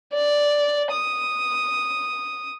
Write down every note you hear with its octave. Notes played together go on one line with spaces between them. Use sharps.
D5
D#6